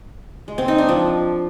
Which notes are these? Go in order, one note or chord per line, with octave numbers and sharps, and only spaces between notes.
G#3
C4
D#4
D4
F3